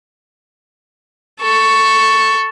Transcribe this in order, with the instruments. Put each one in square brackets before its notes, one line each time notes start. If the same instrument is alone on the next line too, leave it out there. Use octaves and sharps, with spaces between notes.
[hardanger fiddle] A4 C#6